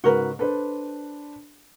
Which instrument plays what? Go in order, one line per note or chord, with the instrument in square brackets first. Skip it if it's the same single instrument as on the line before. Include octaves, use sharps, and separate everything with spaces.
[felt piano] G#2 C#3 [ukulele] F#4 A#4 B4
[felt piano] D4 B4 C5 [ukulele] A4